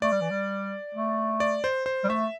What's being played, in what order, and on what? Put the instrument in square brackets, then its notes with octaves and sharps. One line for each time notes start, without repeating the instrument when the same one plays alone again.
[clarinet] A3 [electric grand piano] D5
[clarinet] G3
E3
G3
A3
[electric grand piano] D5
C5
C5
[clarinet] G3
[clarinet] A3 [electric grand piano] E5